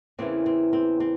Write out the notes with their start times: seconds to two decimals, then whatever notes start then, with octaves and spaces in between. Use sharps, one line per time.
0.19 E2 C#3 E3 A#3 C4
0.46 C4
0.73 C4
1.00 C4